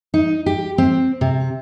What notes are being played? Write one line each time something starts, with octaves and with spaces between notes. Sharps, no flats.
D#4
G4
C4
C3